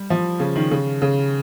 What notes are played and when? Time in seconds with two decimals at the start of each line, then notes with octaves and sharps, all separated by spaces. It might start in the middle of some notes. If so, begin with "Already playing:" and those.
Already playing: G3
0.10 F3
0.40 C#3
0.56 D#3
0.71 C#3
1.02 C#3